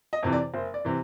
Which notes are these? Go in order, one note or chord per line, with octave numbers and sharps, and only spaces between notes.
D#5
F2 C3 E3
D5
F#1 C5
D5
C3 E3